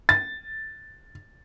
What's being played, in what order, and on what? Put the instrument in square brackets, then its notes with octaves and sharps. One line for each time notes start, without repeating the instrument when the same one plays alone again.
[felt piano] A6